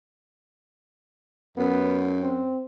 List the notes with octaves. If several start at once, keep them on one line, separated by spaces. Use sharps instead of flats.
F#2 B3
C4